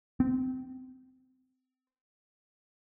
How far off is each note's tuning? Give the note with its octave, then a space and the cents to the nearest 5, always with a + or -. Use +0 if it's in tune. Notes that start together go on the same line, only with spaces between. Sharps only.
C4 -25